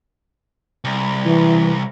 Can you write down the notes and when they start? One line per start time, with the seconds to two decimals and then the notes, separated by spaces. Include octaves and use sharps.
0.84 C2
1.25 E3